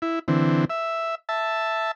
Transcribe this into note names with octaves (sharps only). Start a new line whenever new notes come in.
E4
D3 E3 C4
E5
E5 A5